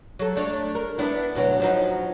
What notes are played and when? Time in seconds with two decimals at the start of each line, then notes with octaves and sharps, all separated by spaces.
0.19 F#3 A4
0.35 A3 D4 C#5
0.75 A#4
0.98 B3 D4 E4
1.35 D2 B2 F#3
1.60 F3 F#3 D#4